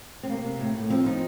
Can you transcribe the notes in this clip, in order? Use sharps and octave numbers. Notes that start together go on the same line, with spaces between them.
C4
C3 A#3
C3
A2
A2
F3 C4
F3 D#4